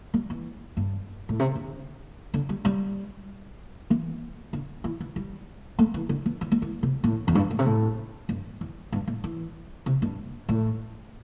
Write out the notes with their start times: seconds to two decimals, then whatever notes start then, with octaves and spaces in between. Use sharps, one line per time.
0.14 G3
0.30 E3
0.77 G2
1.29 A2
1.40 C3
1.55 D3
2.34 D3
2.49 G3
2.65 G3
3.90 E3
4.53 D3
4.84 E3
5.01 E3
5.16 G3
5.79 A3
5.94 E3
6.09 D3
6.26 E3
6.41 E3
6.52 G3
6.62 E3
6.83 C3
7.04 A2
7.28 E2
7.35 G2
7.51 A2
7.59 C3
7.66 A2
8.29 G2
8.61 E2
8.92 G2
9.07 A2
9.24 E3
9.86 C3
10.02 G2
10.49 A2